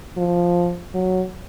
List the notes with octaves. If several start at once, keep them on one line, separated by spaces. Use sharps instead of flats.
F3
F#3